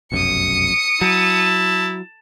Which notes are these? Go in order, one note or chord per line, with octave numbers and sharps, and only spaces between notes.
F1 B1 F#2 D#6 C#7
F#3 E4 A5